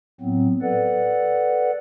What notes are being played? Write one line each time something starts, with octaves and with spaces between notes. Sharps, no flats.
A2 F#3 B3 C4
A4 B4 D5 F#5